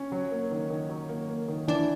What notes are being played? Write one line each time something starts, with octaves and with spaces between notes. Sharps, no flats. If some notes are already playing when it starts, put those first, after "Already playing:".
Already playing: C#4
F#3
A#3
D#3
D#3
F#3
A#3
A#3
D#3
E3 D4